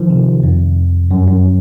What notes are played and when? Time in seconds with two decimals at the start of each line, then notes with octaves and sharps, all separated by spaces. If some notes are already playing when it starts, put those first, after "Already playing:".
Already playing: D#3 F3
0.10 C3
0.43 F2
1.11 F#2
1.28 F#2